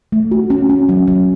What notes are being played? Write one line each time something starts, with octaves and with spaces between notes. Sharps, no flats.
A3
F#4
C#4
C#4
F#3
F#3